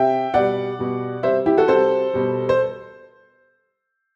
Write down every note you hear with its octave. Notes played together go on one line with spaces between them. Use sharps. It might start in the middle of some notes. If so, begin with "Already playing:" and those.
Already playing: C3 E5 G5
B2 G3 D5 F#5
B2 G3
C3 G3 C5 E5
E4 G4
F#4 A4
C3 G3 A4 C5
B2 G3
C5